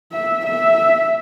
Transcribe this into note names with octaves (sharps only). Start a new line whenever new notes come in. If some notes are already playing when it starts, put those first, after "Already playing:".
E5
E5